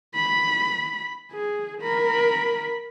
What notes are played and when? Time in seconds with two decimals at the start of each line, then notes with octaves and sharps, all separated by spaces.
0.15 B5
1.32 G#4
1.81 A#4 B5